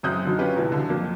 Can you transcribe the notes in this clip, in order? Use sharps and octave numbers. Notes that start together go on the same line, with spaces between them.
A1 F#2 C4 D#6 F#6 G6
F#2 D3 D#3 F#3
C#4 F4 G4 B4
C#2 B2 E3
D#1 D3
F2 F#3 A#3